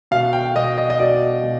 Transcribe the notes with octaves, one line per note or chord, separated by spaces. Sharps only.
B2 F5
G5
B2 D#5
D#5
D#5
B2 D5
B2